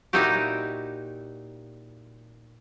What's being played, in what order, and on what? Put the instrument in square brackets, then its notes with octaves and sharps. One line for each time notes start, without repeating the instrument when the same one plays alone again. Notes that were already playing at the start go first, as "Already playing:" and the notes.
[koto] A#2 D#4 E4 F#4 G4